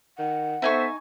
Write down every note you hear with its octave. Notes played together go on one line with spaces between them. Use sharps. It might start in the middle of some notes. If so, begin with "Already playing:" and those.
D#3 F#5
B3 D#4 A4 C5 E5 G#5 C#6